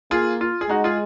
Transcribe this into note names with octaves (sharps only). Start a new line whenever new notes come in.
A#3 F4 G#4
F4
G#4
G#3 D#4 F#4
F4 G#4